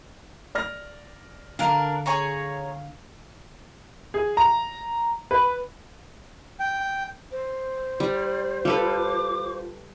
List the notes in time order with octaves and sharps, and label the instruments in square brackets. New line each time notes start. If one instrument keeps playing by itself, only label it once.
[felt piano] D5 F6 A#6
[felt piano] D3 F5 [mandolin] D4 A#4
[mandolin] G#4 C#5 A#5
[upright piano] G#4
A#5
B4
[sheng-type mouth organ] G5
[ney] C5
[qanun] G3 [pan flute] D5
[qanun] G3 A4 B4 [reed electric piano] F4 [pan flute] D6